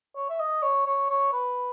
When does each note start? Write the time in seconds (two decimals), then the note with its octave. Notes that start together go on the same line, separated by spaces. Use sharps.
0.16 C#5
0.30 E5
0.40 D#5
0.63 C#5
0.87 C#5
1.10 C#5
1.33 B4